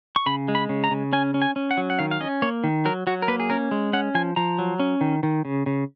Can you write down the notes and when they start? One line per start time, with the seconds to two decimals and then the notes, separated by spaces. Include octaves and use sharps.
0.16 C#6
0.26 C#3 B5
0.48 G#3
0.55 B5
0.69 C#3
0.84 A#5
0.91 C#3
1.13 C#4 G#5
1.34 C#4
1.42 G#5
1.56 C#4
1.71 F#5
1.77 F#3
1.90 F#5
1.99 D#3 F5
2.11 F5
2.20 C#4 D#5
2.42 A#3 C#5
2.64 D#3
2.85 F#3 A#4
3.07 F#3 F#4
3.22 A#4
3.28 A#3 B4
3.40 G#4
3.50 C#4 A#4
3.71 G#3
3.93 C#4 F#5
4.15 F3 G#5
4.36 F3 A#5
4.59 F#3
4.80 C#4
5.01 D#3
5.23 D#3
5.45 C#3
5.66 C#3